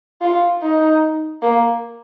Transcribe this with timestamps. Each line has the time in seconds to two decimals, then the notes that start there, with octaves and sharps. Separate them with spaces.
0.21 F4
0.62 D#4
1.42 A#3